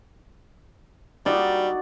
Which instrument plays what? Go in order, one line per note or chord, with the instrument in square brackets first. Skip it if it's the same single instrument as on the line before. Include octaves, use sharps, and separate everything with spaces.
[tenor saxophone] G3 [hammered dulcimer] D#4 F#4 D5